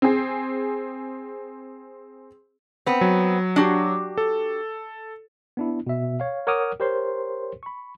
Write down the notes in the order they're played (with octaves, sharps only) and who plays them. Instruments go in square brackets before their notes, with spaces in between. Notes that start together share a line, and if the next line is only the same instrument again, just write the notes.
[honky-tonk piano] C4 G#4
[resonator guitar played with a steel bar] B3 C4
[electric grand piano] F#3
[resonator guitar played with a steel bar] D4 F#4 G4
[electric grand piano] A4
[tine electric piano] B3 D4 E4
B2 E5
C#5 F5
A#4 C#5 F#5 D6 D#6 F6
G4 A#4 C5 C#5 C6
B5 C#6